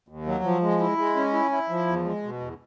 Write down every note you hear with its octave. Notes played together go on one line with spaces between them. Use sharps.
D#2
F#3
F3
G#3
E4
G#3
C#4
E4
E4
F3
E2
G#3
B2
E2